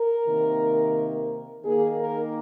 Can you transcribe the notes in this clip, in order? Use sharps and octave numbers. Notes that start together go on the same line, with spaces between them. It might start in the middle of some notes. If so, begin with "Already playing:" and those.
Already playing: A#4
C3 D#3 A#3
D#3 A#3 G#4
A#4